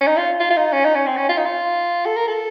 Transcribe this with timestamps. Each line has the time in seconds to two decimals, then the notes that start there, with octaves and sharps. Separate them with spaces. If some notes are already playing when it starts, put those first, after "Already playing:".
0.01 C#4
0.07 D#4
0.17 F4
0.40 F4
0.51 F4
0.57 D#4
0.73 C#4
0.85 D#4
0.95 C#4
1.06 C4
1.17 C#4
1.29 F4
1.38 D#4
1.45 F4
2.06 A4
2.16 A#4
2.28 A4